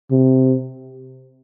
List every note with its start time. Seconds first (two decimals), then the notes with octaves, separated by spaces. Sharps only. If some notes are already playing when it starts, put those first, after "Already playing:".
0.11 C3